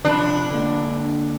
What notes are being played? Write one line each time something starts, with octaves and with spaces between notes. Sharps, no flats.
C3 F3 D4 B5
D3 A#3